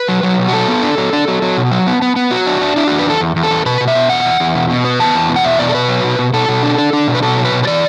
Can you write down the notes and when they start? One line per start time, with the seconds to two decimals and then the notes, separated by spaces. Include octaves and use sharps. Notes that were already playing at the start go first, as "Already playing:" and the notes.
Already playing: B4
0.08 F#3
0.23 F#3
0.38 B2
0.48 F#4
0.53 F#3 A4
0.68 B3
0.83 D4
0.98 F#3
1.13 D4
1.28 F#3
1.42 F#3
1.57 B2
1.71 F#3
1.87 B3
2.02 B3
2.16 B3
2.31 F#3 F#4
2.47 D4
2.61 D4
2.76 D4 E4
2.87 E2 F#4
2.99 B4
3.06 E2 A4
3.21 E2
3.36 E2
3.43 A4
3.51 E2
3.66 B2 B4
3.81 B2
3.88 E5
3.95 B2
4.10 E2 F#5
4.25 E2
4.40 E2
4.55 B2
4.70 B2
4.84 B3
4.99 E2 A5
5.15 E2
5.29 B2
5.36 F#5
5.44 E2 E5
5.59 B2 D5
5.69 A4
5.74 B2 B4
5.89 F#3
6.04 B2
6.19 B2
6.33 B2 A4
6.48 B2
6.63 D4
6.78 D4
6.93 D4
7.08 B2
7.15 B4
7.23 B2 A4
7.37 F#3
7.45 B4
7.52 B2
7.63 B4
7.67 E3 D5